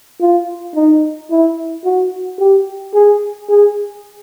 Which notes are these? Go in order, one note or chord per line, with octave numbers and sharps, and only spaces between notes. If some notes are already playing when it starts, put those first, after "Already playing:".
F4
D#4
E4
F#4
G4
G#4
G#4